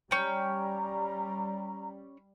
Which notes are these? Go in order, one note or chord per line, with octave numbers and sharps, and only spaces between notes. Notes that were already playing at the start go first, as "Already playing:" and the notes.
G3 C#4 G5 A#5